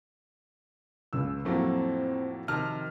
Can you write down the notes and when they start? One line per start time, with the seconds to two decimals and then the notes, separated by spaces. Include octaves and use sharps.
1.13 C#2 C#3 E6
1.45 F2 A2 F#3 A3 A#3 C4
2.48 C3 D#3 A5 F6